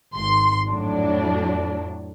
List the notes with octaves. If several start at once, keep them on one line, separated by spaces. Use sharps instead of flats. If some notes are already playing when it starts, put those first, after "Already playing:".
G#1 C6
F2 A2 F#3 D4